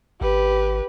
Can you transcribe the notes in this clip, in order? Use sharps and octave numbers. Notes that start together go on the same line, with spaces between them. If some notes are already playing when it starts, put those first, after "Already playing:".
G#1 G4 B4